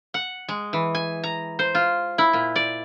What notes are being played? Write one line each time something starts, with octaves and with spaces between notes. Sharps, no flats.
F#5
G#3
E3
G#5
A#5
C5
F4
E4
A#2
D5